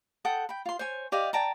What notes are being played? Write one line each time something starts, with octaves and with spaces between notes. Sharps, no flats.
A4 F#5 G5 D#6
G5 B5
F4 C6
C5 C#5 G#5
G4 D5 D#5 F5
D5 G5 A5 A#5